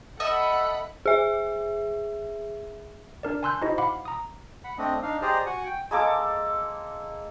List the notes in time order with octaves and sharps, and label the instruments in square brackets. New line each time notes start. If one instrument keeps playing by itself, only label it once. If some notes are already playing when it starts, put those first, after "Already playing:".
[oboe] A4 [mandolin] D#5 E5 E6 [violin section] F#5 B5
[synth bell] G#4 E5
[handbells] D4 A#4 D5
G#5 A5 C6 E6 F#6 G6
D#4 E4 F#4 G4 C5 D#5
F5 F#5 B5 D6
A#5 D#6
[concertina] F#5 B5
A3 C4 D4 D#5
D4 D#4 F5
G4 G#4 C5 D5 D#5 A#5
F#4 F#5 G#5
G5
[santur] G#3 A#3 A4 D6